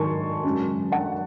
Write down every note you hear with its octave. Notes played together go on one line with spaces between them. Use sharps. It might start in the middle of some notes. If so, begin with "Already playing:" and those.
Already playing: G#2 D#3 G#3 G#5 A5 C6 C#6
F#2 C#3 G#3
F#5 A5